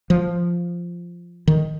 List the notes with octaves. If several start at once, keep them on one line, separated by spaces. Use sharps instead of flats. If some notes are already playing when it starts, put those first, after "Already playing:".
F3
D#3